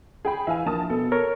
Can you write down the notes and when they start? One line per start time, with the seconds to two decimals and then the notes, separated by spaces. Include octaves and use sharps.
0.25 G#4 G5 B5
0.47 E3 E5 F5 G#5
0.66 A#1 A#4 A5 D#6
0.90 B2 A4
1.12 A#4 C#5